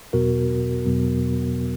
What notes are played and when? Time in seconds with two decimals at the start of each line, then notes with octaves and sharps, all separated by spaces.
0.13 E2 B2 F#3 B3 F#4 A#4
0.86 E2 B2 F#3 B3